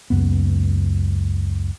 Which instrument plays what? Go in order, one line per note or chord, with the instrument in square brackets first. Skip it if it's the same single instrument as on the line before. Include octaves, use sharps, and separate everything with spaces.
[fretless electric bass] C#2 F#2 A#3 B3